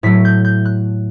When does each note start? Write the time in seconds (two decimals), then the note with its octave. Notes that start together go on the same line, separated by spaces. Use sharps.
0.03 A2 F#3 A3 B6
0.25 G6
0.45 G6
0.65 F#6